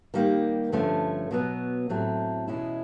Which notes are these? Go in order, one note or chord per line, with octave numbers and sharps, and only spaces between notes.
D#3 G3 A#3
G2 D3 F3 A3 C#4
B2 F#3 B3
A2 F#3 A3 C4
E2 B2 G#3 C#4 E4